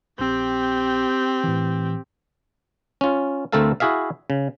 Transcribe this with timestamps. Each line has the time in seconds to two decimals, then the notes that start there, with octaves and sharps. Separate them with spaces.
0.19 A#1 C4 G4
1.44 A2 E3
3.01 C#4 F4
3.52 D2 A3 C4 A4 A#4 F5
3.80 E4 F#4 G#4 E5 F5
4.30 C#3